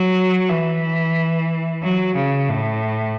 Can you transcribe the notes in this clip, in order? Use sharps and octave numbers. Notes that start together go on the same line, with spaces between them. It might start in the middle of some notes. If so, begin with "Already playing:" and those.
Already playing: F#3
E3
F#3
C#3
A2